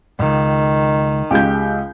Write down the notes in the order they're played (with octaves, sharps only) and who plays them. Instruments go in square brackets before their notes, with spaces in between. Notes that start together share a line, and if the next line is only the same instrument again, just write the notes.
[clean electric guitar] C#2 G2 [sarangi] D#3
[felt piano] C#2 G#3 G6 [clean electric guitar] G4